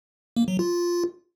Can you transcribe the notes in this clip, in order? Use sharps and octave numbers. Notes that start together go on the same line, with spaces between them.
A#3
F#3
F4